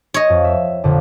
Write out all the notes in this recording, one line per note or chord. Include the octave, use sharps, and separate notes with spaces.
C#5 D#5
F2
E5
A#1 F2 D3